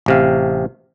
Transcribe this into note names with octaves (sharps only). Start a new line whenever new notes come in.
A1 C3 F5